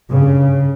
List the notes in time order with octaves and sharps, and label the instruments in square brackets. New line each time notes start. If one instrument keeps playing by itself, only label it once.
[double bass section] G2 C#3